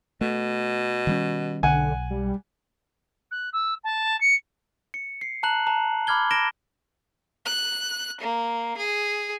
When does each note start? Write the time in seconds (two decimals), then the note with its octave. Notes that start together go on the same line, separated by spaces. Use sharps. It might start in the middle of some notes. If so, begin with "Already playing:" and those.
0.21 B2 A3
1.07 D#3 G3 C#4
1.63 B1 D3 F#5 G#5
2.11 G3
3.31 F#6
3.53 E6
3.84 A5
4.20 C#7
4.94 C#7
5.21 C7
5.43 A5 A#5 F#6 F#7
5.67 A5 A#5
6.07 B5 D6 F6 G#6 G7
6.31 A#6 D7 E7 G7
7.45 F#6
8.21 A#3
8.77 G#4